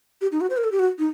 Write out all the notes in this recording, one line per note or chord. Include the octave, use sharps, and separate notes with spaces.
G4
D#4
F#4
C5
A#4
A4
G4
F#4
D#4